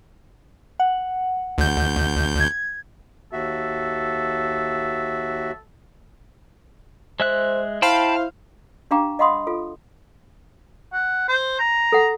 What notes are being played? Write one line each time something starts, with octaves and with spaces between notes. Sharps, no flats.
F#5
D2 G6
G#6
D#2 F#4 A4 E5
G#3 C5 E5 F#6
E4 C5 F5 G5 A5 B5
D4 G4 F5 G5 A#5 D6
D#5 F5 F#5 B5 C6 D#6
F4 A4
F#5
C5
A#5
A4 F#5